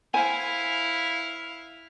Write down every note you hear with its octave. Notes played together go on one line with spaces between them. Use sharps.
E4 C5 F5 G#5